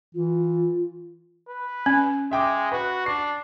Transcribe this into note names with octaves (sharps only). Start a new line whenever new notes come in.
E3 F4
B4
C#4
G#3 E5 G5 D6
F#4 B4
D4 C7